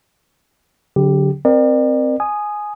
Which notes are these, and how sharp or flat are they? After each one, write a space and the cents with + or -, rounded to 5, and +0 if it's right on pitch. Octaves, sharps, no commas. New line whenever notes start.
D3 -45 F#3 -15 G4 +0
C4 +0 A#4 +15 D5 +40
G#5 +10 D#6 -10